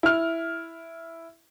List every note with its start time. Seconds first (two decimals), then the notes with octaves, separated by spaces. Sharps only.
0.03 E4 F6